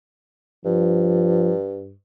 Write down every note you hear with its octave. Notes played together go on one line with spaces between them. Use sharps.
G2 F3